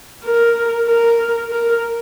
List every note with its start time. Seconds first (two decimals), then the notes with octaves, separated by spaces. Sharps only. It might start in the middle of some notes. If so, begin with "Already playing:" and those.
0.25 A#4
0.88 A#4
1.51 A#4